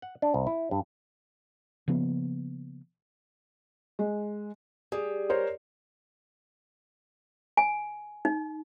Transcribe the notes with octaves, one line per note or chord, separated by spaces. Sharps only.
F#5
D4
C2
E4
G2
C#3 F3 A#3 B3
G#3
G3 G#4
A#4 C5 C#5
G#5
D#4